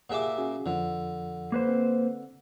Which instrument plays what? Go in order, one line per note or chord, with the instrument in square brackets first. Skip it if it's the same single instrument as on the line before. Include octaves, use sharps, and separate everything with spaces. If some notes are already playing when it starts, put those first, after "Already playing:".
[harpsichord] A#2 E5 D6 [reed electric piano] G4 G#4 F#5
[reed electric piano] C#4 F#4 G#4
[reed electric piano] F2 F3 [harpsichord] D3
[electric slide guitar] A#3 B4 C5
[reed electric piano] C4